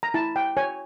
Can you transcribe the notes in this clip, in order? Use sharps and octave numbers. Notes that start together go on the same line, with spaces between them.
A#5
E4 A5
G5
C#5 G#5